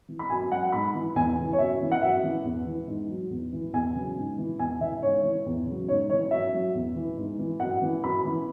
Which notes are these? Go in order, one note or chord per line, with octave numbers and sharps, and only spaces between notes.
E3
B5
F#2 G#5
F#3 F#5
G#2 B5
E3
E2 G#5
C#3 E3
C#5
F#2 E5
E3
F#5
F#2 E5
E3
E2
E3
G#2
F#3
E2
E3
E2 G#5
C#3 F#3
G#2
E3
E2 G#5
C#3 E3 E5
G#2 C#5
E3
E2
C#3 F#3
G#2 C#5
E3 C#5
F#2 E5
F#3
E2
E3
G#2
E3
F#2 F#5
E3
F#2 B5
E3